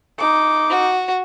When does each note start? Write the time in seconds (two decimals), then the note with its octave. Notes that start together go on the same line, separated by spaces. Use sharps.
0.19 D#4 D6
0.69 F#4